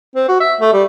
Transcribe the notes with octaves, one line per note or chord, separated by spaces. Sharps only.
C4
F#4
E5
A3
G3